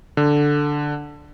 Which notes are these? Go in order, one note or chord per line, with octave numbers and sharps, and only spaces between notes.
D3